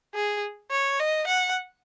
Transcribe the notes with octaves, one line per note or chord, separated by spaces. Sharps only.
G#4
C#5
D#5
F#5